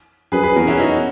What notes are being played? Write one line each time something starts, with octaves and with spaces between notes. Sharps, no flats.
F#2 G#4 B4
G#4 B4
E2 F#4 A#4
C#4 E4
D#4 F#4